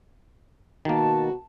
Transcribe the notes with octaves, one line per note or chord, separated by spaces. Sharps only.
B2 D#3 A#3 F#4 A5